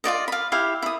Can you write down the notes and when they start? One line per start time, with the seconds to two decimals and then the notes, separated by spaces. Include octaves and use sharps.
0.04 F4 F#4 D5 D#5
0.28 F5 B5
0.52 E4 G4 F5
0.82 E4 D#6